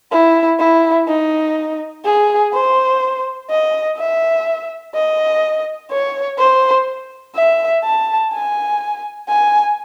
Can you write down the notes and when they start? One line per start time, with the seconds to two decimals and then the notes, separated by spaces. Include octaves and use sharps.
0.12 E4
0.59 E4
1.08 D#4
2.05 G#4
2.53 C5
3.50 D#5
3.98 E5
4.94 D#5
5.91 C#5
6.38 C5
7.35 E5
7.84 A5
8.33 G#5
9.28 G#5